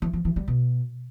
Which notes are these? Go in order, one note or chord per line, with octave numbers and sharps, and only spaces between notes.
E3
F3
E3
G3
B2